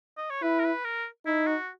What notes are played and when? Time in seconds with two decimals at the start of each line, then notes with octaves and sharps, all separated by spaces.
0.17 D#5
0.30 C#5
0.42 E4 B4
0.59 A#4
0.64 B4
0.84 A#4
1.26 D#4 E4
1.47 F#4